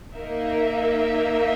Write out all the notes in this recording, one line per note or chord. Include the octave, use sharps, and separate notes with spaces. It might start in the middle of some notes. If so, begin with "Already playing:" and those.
A#3 D#4 A#4 E5